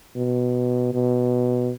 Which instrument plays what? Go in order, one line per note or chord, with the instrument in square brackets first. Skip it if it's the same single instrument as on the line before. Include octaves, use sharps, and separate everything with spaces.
[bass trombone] B2
B2